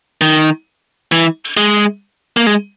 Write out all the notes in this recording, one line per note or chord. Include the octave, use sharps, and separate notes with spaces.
D#3
E3
G#3
A#3
G#3